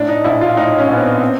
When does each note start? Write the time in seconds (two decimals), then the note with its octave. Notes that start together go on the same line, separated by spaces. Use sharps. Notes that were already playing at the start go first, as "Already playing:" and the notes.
Already playing: A2 D4
0.09 D#4
0.24 A#1 E4
0.41 F4
0.57 A2 D#4
0.79 C#4
0.89 A#1 B3
1.00 C4
1.21 C4